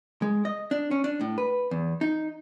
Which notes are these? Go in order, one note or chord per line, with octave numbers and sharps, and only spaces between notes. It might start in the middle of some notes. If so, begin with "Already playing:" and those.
G#3
D#5
D4
C#4
D4
A2
B4
E2
D#4